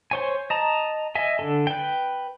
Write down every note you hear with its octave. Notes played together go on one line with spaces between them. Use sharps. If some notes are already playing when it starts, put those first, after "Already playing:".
C5 C#5 G#5
D#5 A5 A#5
D#5 E5 G#5
D3 A4
B4 G5